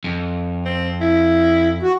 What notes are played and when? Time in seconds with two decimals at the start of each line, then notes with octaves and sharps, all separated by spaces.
0.04 F2
0.65 C4
1.01 E4
1.83 F#4